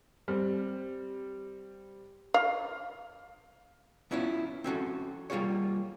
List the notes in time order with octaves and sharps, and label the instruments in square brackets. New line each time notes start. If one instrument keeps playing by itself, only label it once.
[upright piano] G3 C4
[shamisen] F5
[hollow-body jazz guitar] B3 C#4 E4 F4 C#5
C4 C#4 F#4 A4
G3 A#3 F4 G#4 C#5